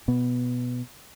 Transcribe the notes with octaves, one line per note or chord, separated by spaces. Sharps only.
B2 B3